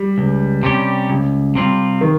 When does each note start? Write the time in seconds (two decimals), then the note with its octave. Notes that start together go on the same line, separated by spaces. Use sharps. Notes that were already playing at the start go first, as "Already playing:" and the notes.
Already playing: G3
0.18 C#2
0.63 C3 G3 C#4 G4
1.10 C#2
1.55 C3 G3 C4 F4
2.01 D#3